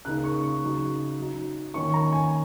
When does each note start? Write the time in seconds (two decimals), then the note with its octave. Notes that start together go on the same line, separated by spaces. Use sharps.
0.05 C#3 A#3 D#4 F#6
0.24 C#6
0.42 C#6
0.62 C#3 F#3 D#4
1.18 F#3 D#4
1.74 D#3 A#3 C#4 C#6
1.94 A#5
2.13 G#5